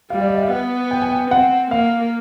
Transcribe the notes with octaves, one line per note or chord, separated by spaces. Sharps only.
G3 F5
D5
D#5
E5
F5
B3 F#5
G5
G#5
G5
C4 F#5
A#3 F5